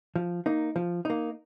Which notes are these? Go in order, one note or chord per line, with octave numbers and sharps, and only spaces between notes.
F3
A#3 D#4
F3
A#3 D#4